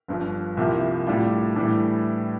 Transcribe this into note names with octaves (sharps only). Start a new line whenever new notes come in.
G1 G2 F3
C2 C3 F3 A#3 E4
A2 G3 D4 F4
A2 E3 G3 D4